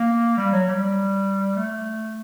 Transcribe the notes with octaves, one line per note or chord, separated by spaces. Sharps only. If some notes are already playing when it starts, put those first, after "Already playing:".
Already playing: A#3
G3
F#3
G3
A3